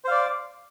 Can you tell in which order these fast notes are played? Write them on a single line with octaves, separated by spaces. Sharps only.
C5 F5 D5 D6